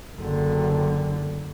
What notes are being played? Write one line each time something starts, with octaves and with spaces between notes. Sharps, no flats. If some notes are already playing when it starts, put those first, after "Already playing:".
F#1 D3